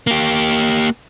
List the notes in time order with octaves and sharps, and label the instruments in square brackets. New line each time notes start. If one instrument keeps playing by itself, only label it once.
[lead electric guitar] A#3 G4